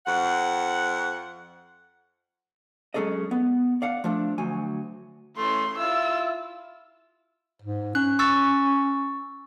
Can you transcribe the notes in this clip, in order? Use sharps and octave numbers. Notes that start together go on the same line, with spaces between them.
F2 F#5
F#3 G#3 C#4 G#4 A4 D#5
B3
D5 F5 F#5
F3 A3 D4
D2 F#3 G#5
E3 A3 C#4 C6
E4 F4 E6
G#2
C#4 F#6
C#6 E6 A6